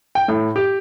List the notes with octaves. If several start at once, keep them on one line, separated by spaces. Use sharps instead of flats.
G5
A2
G4